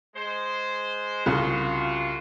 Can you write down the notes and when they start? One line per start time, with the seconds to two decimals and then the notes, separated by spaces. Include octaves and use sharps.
0.16 G#3 C5
1.26 C2 C#3 F4 F#4